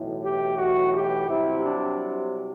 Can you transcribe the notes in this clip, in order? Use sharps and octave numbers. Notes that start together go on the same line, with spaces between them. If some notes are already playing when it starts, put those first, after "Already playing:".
Already playing: B1 A2 E3
G4
F#4
G4
C2 C3 F#3 E4
D4